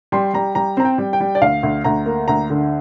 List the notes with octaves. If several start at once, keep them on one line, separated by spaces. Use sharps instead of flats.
G3 C6
G3 A#5
G3 A#5
C4 A#5
G5
G3
G5
G3
D5
D2 F5
D2
D2 A#5
A#3
D2 A#5
D3